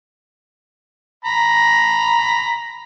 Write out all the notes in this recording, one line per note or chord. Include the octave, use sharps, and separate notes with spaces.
A#5 B5